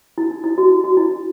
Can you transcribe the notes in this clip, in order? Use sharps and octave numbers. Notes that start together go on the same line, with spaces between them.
E4
D#4
E4
F#4
E4
F#4
E4